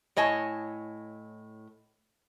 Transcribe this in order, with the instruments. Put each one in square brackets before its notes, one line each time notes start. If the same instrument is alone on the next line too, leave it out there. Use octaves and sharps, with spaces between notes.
[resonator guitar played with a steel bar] A2 C#5 D#5 G#5 A5